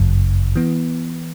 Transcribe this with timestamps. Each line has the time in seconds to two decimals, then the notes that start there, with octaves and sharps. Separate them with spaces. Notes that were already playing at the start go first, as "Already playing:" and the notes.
Already playing: G1 F#2 C#3
0.55 E3 B3